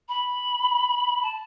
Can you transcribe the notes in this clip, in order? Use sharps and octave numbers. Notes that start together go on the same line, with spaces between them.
B5
A5